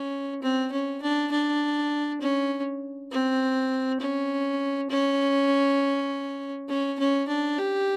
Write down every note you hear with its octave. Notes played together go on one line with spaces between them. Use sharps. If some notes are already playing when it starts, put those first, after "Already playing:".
Already playing: C#4
C4
C#4
D4
D4
C#4
C4
C#4
C#4
C#4
C#4
D4
G4